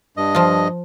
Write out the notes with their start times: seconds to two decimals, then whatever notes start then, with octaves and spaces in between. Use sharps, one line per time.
0.17 G2 D#5
0.35 F3 F4